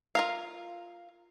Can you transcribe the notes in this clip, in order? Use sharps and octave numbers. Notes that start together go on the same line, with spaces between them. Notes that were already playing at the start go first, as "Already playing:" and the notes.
F4 A#4 F5